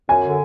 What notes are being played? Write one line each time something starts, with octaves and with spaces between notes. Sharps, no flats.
F#2 G#5
D3